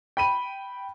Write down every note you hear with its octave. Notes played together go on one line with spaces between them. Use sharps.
G5 B5 D#7